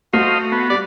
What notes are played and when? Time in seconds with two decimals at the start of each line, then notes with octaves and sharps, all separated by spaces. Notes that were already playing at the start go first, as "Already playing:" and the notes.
0.13 A3 F#4 C5 D#5 F5
0.52 B3
0.70 G3 D5